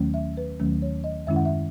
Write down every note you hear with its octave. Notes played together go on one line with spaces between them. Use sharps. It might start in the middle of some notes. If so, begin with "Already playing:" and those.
Already playing: D#2 D#3 F#3 A3 C#4
E5
B4
D#2 D#3 F#3 A3 C#4
C#5
D#5
F#2 D#3 G#3 C#4 E4 E5
F#5
E5